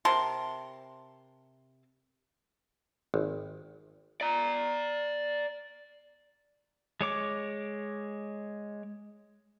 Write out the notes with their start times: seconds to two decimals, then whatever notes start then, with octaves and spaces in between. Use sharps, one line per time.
0.05 C3 A#4 A5 C6
3.14 G#1
4.21 D5 A#5
7.01 G#3 C#5 D6